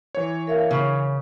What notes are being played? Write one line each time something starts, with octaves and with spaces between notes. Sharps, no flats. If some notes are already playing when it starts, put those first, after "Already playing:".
E3 C#5
A#4 E5 F5
C#3